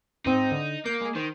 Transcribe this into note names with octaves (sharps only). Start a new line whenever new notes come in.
G#2 C4 D#4
D3
A#3 G6
G#3 G#4
D#3 C5